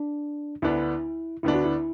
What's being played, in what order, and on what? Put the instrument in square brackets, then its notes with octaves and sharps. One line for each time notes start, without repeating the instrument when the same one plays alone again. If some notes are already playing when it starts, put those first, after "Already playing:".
Already playing: [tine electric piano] D4
[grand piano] D2 D3 B3 D4 [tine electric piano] E4
[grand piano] D2 D3 B3 D4 [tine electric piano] E4
[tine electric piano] F#4
E4